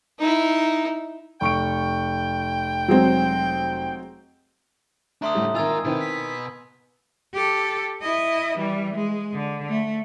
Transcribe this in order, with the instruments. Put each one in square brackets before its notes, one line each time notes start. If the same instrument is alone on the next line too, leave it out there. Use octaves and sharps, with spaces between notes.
[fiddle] D#4 E4
[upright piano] F1 C#6 D7 [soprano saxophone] G5
[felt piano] F#3 G#3 C4
[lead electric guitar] A3 D4 [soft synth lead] E5 [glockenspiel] A#5 C6 D#6
[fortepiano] A2 C#3 G3
[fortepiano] G#1 D#3 [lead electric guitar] F4 A#4 [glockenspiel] G#5 E6 G#6
[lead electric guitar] B2 B4 [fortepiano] D#3 C4 E4
[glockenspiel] E6 [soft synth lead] B6
[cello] G4 A4
E4 D#5
E3 G3
G#3
D3
A3